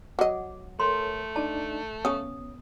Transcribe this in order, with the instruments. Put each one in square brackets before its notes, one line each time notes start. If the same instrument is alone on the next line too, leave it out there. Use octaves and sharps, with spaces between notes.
[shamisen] F#3 D#5 [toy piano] F#5 [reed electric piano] D6
[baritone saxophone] A3 [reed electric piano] A4 A#4 C#5 [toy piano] C6
[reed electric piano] D4 D#4 D5 [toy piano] A5
[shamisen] C#3 C#4 [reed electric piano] B3 [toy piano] D#6